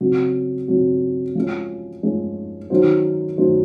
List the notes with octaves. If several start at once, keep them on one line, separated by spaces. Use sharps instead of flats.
C#3 F#3 C4 F#4
C#3 F#3 C4 F#4
F3 G#3 C#4
F3 G#3 C#4
D#3 F#3 C#4 F#4 C5
D#3 F#3 C#4 F#4 C5